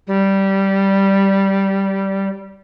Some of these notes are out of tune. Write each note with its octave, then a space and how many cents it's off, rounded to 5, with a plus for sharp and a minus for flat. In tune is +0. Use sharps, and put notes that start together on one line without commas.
G3 -10